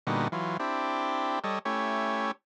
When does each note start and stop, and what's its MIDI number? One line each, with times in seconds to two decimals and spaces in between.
0.07 0.28 46
0.07 0.28 50
0.07 0.28 55
0.07 0.28 59
0.07 0.28 63
0.07 0.28 66
0.32 0.57 52
0.32 0.57 54
0.32 0.57 65
0.60 1.39 60
0.60 1.39 62
0.60 1.39 64
0.60 1.39 67
1.44 1.59 55
1.44 1.59 69
1.44 1.59 73
1.44 1.59 75
1.65 2.31 57
1.65 2.31 61
1.65 2.31 64
1.65 2.31 67
1.65 2.31 73